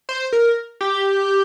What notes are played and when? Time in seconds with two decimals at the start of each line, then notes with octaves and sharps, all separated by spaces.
0.09 C5
0.33 A#4
0.81 G4